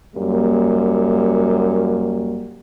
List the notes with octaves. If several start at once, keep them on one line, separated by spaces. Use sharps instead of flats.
F#2 G3 A#3